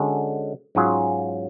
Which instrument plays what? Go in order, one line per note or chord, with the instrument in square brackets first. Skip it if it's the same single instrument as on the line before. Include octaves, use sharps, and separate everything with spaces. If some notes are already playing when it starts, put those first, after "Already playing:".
Already playing: [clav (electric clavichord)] D3 G#3 C#4 F#4 A4
G#2 F#3 C#4 F4 G#4